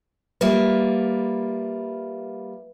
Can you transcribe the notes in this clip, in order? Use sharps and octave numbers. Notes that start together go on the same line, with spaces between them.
G3 A#3 F4 B4 E5